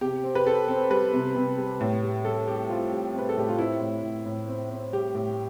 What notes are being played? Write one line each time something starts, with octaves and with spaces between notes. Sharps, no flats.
C3 G4
C4
B4
C4 A4
C4
G3 B4
C3
C3
G3
A2
G3
G3 A4
G3 G4
C4 F4
G3
C4 B4
A4
A2 G4
F4
C4 E4
A2
A2
A2
C4
C4
G3 G4
A2